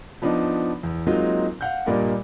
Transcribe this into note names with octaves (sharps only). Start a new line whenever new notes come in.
F3 B3 D4 D#4 F4
E2
F#3 G#3 A#3 C4 D#4 F4
F5 F#5 G6
G2 A#2 G3 A#3 D5 D#5